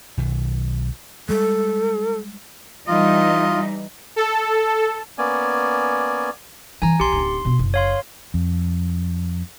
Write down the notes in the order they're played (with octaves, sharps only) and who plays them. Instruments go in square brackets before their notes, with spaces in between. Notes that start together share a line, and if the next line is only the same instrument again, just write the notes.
[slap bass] B1 D#3
[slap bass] G3 G#3 [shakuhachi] A4
[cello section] E3 G3 D#4 [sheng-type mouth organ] F4 [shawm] D#5
[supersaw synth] A4
[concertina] A#3 B3 C#4 D5 G#5
[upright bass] E3 G3 [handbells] G#5 A#5
[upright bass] A#1 [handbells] G4 C6
[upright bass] D1 D#4 [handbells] C6
[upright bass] B2 B3
F#1
[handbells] C#5 F5 C6
[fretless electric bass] F2